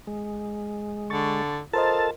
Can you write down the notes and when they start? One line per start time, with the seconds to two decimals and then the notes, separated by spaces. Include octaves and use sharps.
0.07 G#3
1.10 D3 C#6 A6
1.73 F4 A4 A#4 C5 D#5 A5